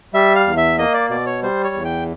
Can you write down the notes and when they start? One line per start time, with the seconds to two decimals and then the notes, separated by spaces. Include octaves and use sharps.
0.14 G3 E5
0.35 F5
0.46 E2
0.57 E5
0.78 A#3 D#5
0.94 D5
1.10 B2 D5
1.26 C#5
1.42 G3 C5
1.64 C#5
1.74 E2
1.85 G5